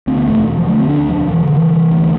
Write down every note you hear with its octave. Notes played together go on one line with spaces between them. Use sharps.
D2 C4
B3
E1 A3
E1
F3
D3 A3
C4
D2 D4
E1 F3
E1 E3
D3
C3
E3
C3
D2